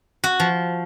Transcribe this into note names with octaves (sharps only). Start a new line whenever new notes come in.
F#4
F3